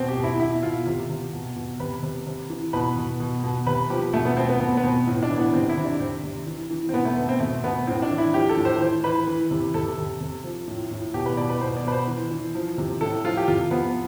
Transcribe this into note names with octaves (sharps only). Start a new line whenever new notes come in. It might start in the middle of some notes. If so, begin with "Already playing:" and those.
Already playing: B2 C4
G4
B2
E4
B2 E4
B2 F4
C3 F4
C3
B2
B2
C3 B4
C3
C3
E3
B2 B4
B2
B2
B2
C3 B4
F3 G4
B2 A3
B3
B2 C4
B3
B2 B3
B3
B2 C4
A2
D4
E3
B3
C3 C4
D4
E4
C3
D4
C3 C4
C3
E3
E3
C4
B2 B3
A3
B2 B3
C4
B2 A3
B2 B3
A2 C4
D4
E3
E4
F3 G4
A4
A2
C5
E3 C5
E3 B4
E3
C3
C3 A4
C3
C3
F3
A2
A2
B2 G4
B4
B2 D5
B4
B2 C5
D5
B2 B4
C5
E3
E3
F3
C3
A2 A4
F3 F4
G4
C3 F4
F3 B3